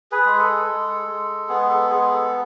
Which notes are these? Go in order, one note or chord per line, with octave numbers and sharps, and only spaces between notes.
G#4 B4
G#3
A4
G#3
G#3
B3 G#4
A4
G#3 G#4
A4